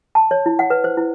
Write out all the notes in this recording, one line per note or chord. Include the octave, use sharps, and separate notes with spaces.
A5
C#5
E4
F#5
B4
C5
E4